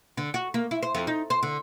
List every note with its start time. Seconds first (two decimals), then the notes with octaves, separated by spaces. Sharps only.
0.17 D3
0.34 F#4
0.54 A#3
0.71 E4
0.83 C5
0.95 F2
1.07 D#4
1.30 C5
1.43 D3